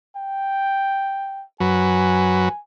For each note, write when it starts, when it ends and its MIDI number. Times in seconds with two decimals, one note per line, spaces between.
0.16 1.44 79
1.60 2.49 42
1.60 2.49 54
1.60 2.49 71
1.60 2.59 80